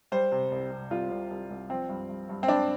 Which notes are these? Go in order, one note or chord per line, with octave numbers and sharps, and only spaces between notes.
G3 C5
C3
C2
C3
C2 F4
C2
C2
C2
F3 C4
G2
G2
G2
C4
G2 D4